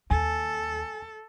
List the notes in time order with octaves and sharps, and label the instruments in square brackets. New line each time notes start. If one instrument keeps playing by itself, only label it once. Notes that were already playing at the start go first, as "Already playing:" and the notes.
[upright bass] D#2 [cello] A4 [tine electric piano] G#5